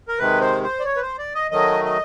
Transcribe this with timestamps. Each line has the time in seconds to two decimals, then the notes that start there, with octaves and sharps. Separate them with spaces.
0.08 A#4
0.19 C3 D#3 G#3 B4
0.41 C5
0.63 C5
0.80 D5
0.85 C#5
0.97 B4
1.02 C5
1.19 D5
1.35 D#5
1.51 D#3 F#3 A3 D#5
1.85 D#5